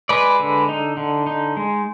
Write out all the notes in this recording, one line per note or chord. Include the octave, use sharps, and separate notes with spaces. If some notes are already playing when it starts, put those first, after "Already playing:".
G#3 B4 D5
D3
D#4
D3
D#4
G#3